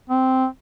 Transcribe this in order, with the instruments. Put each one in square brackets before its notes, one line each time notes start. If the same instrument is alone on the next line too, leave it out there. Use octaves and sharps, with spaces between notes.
[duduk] C4